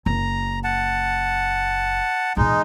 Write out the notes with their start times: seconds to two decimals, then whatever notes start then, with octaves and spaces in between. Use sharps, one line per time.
0.06 F#1 A#5
0.64 F#5 A5
2.37 E2 A#2 G#3 D#4